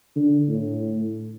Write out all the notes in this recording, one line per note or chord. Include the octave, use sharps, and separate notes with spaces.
D3
A2